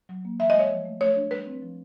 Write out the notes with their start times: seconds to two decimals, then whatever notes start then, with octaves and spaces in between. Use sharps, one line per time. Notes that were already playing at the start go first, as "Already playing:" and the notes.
0.09 F#3
0.25 A#3
0.39 E3 E5
0.50 D#5
0.55 G#3 C#5
0.70 F3
0.85 A3
1.01 A3 C#5
1.16 D4
1.31 G3 B4
1.46 C4
1.62 F3